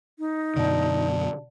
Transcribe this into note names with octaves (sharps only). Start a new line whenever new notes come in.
D#4
F#2 B2 D3 D5 F#5 A5